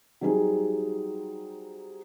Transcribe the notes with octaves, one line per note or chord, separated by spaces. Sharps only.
F#3 G3 C4 D#4 G#4